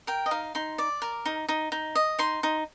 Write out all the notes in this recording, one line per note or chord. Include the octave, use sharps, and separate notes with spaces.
A#4 G5
D#5
D#4 F5
D#4 C6
D5 D6
A#4
D#4
D#4
D#4
D#5
D#4 C6
D#4